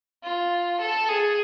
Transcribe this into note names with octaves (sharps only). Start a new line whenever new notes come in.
F4
A4
G#4